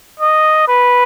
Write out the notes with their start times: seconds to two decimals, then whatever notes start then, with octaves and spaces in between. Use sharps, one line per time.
0.19 D#5
0.68 B4